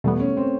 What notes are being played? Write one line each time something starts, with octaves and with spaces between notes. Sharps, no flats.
E2 B2 G3 A3 B3
C#4
C4